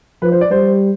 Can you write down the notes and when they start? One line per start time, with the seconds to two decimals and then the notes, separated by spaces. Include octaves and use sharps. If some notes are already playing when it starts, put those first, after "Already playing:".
0.22 F3 B4
0.32 C5
0.41 D5
0.51 G3 C5